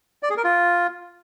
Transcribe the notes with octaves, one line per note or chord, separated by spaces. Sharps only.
D5
G#4
A#4
F4